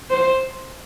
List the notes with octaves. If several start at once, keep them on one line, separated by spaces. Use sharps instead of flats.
C5